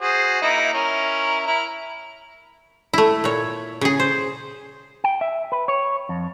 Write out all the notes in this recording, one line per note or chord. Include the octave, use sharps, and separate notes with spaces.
F#4 G#4 C5
A#3 D#4 E4
C#4 E4 A#4
E4 A#4
A3 E4
A#2 C#5
C#3 G#4
C5
G5
E5
B4
C#5
F2